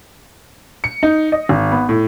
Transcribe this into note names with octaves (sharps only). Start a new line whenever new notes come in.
C#7
D#4
D#5
G#1
B3
A2